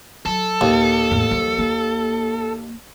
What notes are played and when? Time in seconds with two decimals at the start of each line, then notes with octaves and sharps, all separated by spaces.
0.26 F#3 A4
0.61 D#2 A#2
1.11 E2 A2
1.31 F3 G3
1.59 A#3